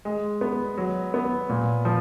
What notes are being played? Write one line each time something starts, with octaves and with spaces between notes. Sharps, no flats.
G#3
B3
F#3
B3
A#2
F3